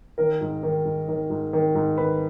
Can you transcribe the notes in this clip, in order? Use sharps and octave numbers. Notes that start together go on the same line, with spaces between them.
D#3 A#4
G#2
D#3
G#2
D#3
G#2
D#3
G#2
D#3 B4